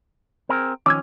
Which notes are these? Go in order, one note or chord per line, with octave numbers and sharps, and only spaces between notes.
C4 G#4 A#4
D#3 F3 C#4 D6 E6 G#6